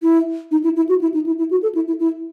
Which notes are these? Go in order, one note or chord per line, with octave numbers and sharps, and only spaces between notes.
E4
D#4
E4
E4
F#4
E4
D#4
E4
E4
F#4
A4
E4
E4
E4